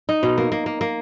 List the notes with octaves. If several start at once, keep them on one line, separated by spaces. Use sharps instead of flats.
D#4
B2
A#3
A#3
A#3
A#3